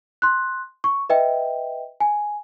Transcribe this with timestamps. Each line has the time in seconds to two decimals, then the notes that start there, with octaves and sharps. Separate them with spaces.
0.22 C6 F#6
0.84 C#6
1.10 B4 D#5 E5 G5
2.00 G#5